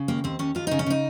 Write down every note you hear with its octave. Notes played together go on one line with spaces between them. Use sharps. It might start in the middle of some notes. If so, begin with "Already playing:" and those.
Already playing: C#3
D#2 A#3
D#2 C4
D#2 C#4
D#2 F4
C#3 D#4
C#4
C#3 D#4